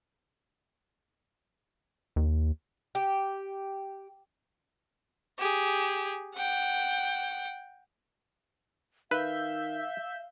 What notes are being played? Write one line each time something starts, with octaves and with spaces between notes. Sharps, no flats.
D#2
G4
G4 G#4
F#5 G5
D#3 B4 E5 F5 G6